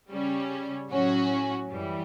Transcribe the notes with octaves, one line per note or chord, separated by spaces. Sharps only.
C#3 G3 C#4
A2 F#3 C#4 F#4
F#2 E3 G3